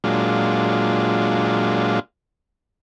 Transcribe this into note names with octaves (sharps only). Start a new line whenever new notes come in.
A#2 F#3 G#3 D4 F4